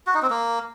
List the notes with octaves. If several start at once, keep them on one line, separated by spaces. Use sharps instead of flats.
F#4
D#4
C4
A#3